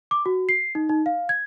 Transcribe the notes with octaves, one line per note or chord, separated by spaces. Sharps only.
D6
F#4
C7
D#4
D#4
F5
G#6